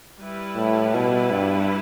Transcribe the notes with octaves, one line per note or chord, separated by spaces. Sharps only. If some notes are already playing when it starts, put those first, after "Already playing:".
G3 E4 B4
A2
B2
G2